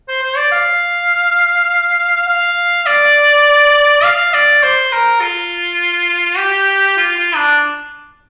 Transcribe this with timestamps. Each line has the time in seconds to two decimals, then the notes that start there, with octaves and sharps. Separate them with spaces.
0.09 C5
0.23 C5
0.37 D5
0.52 F5
2.29 F5
2.86 D5
4.03 F5
4.34 D5
4.63 C5
4.92 A#4
5.21 F4
6.38 G4
6.98 F4
7.17 F4
7.36 D4